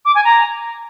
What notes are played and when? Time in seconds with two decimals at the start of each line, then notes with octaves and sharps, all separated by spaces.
0.05 D6
0.15 G#5
0.25 A#5